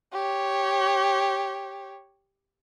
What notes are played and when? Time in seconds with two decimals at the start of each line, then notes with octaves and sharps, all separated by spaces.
0.13 G4 C#5